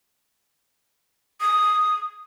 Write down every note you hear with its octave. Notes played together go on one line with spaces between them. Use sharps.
D#6